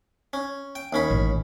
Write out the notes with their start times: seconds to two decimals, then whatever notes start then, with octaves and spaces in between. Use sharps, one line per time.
0.33 C#4
0.75 G5
0.93 D#2 C#4 B5
1.10 A1